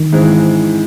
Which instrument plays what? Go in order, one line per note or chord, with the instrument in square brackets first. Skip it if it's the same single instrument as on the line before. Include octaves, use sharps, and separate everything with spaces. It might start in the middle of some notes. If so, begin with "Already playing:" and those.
Already playing: [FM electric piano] D#3
[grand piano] G#2 E3 G#3 C4